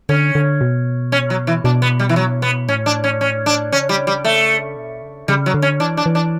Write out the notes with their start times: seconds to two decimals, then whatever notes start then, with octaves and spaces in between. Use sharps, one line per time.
0.09 D3 C#4
0.35 D3
0.61 B2
1.12 C#4
1.30 F#3
1.47 E3
1.64 B2 D4
1.82 B3
1.99 G3
2.09 E3
2.16 F#3
2.42 B3
2.68 A2 C#4
2.86 D4
3.04 C#4
3.21 C#4
3.46 D4
3.72 C#3 C#4
3.89 G3
4.07 G3
4.24 A3
4.76 B2
5.02 C#3
5.28 C#3 G3
5.46 F#3
5.54 D3
5.62 C#4
5.80 E3 D4
5.97 D4
6.06 E3
6.15 D4